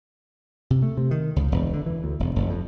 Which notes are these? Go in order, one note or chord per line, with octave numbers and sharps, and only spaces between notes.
C3
A3
C3
D#3
C#2
E1
D3
E3
D2
E1
F1
F2